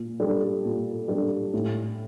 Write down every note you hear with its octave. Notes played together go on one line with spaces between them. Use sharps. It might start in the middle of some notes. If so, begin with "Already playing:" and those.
Already playing: A#2
G3 D4 A4
A#2
G3 D4 A4
A2